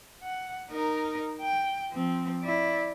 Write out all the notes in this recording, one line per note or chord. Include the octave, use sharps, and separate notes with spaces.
F#5
D#4 A#4
G5
F3 C4
E4 D5